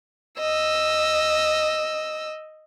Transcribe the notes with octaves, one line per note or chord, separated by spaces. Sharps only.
D#5 E6